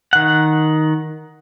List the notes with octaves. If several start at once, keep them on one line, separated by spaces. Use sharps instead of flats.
D#3 F#5